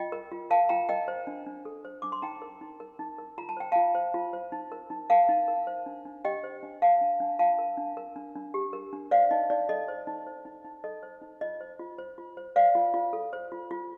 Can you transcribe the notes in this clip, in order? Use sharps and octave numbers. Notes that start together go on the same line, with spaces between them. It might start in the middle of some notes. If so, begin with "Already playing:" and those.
Already playing: F4 D#5 G5
A#4
F4
A#4 F5 A5
F4 G5 A#5
A#4 D#5 G5
C5
D4
D4
A4
C5
D4 D6
C6
D#4 G5 A#5
A#4
D#4
A#4
D#4
A#4
F4 A#5
A5
C5 G5
F4 F5 A5
C5
F4
C5
D#4
A#4
D#4
A#4 F5 A5
D#4
A#4
C5
D4
D4
G4 D#5 G5
C5
D4
A#4 F5 A5
D4
D4
F4 F5 A5
A#4
D4
A#4
D4
D4
G4
A#4
D4
C5 D5 F5
D#4 D#5
D#4 D5
A4 D#5
C5
D#4
C5
D#4
D#4
A4 D#5
C5
D#4
F4 D#5
C5
F4
C5
F4
C5
C5 D5 F5
F4
F4
A4
C5
F4
F4